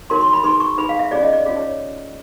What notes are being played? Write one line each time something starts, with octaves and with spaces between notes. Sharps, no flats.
D#4 F#4 A#4 C#5 C6
C6
B5
D#4 G#4 B4 C6
C#6
D#4 G#4 B4 B5
F5
E5
C#4 F4 G#4 C#5 D5
D#5
D5
C#4 F4 G#4 C#5
C#5